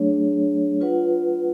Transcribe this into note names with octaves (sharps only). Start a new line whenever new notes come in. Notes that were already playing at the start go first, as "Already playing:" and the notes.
Already playing: F#3 A3 D4 G#4 C#5
F4 B4 F#5